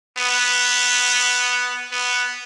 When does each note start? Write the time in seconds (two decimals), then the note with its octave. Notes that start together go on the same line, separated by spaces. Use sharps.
0.18 B3
1.92 B3